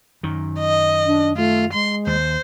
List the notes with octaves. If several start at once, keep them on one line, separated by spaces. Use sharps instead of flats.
F#2 D#3
D#5
D4
A3 F4
G#3 C6
D#2 C5